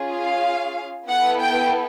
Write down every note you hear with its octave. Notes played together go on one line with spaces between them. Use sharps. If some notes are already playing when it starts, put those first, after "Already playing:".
Already playing: C#4 F4 G#4
F5
B3 E4 A4 F#5
G5